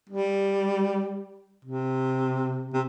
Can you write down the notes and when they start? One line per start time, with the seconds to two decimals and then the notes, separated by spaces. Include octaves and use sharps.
0.10 G3
1.65 C3
2.73 C3